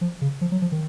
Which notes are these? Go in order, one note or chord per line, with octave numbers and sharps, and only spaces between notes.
F3
C#3
F3
F#3
F3
D#3